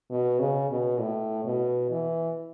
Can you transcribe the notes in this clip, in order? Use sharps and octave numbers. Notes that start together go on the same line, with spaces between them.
B2
C#3
B2
A2
B2
E3